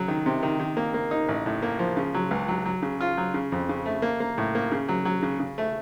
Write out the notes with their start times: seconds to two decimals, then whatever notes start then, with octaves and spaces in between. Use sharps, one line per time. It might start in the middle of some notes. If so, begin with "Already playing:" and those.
Already playing: C#3 F#3
0.08 D#3
0.26 C3
0.43 D#3
0.59 D#3
0.77 A#3
0.94 A#3
1.11 D#4
1.28 A1
1.46 A2
1.62 A#3
1.79 F3
1.97 C#3
2.14 F#3
2.31 C#2
2.48 F#3
2.66 F#3
2.82 C#3
3.01 F4
3.17 F#3
3.34 C#3
3.52 F2
3.69 C#3
3.86 A3
4.02 A#3
4.20 A#3
4.38 A2
4.55 A#3
4.72 C#3
4.89 F#3
5.05 F#3
5.23 C#3
5.40 C#3
5.58 A3